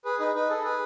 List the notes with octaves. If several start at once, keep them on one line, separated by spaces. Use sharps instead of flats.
G#4 B4
D#4 B4
D#4 B4
G#4 A4
G#4 B4